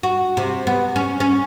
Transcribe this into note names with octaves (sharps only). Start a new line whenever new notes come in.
F#4
C3
B3
C#4
C#4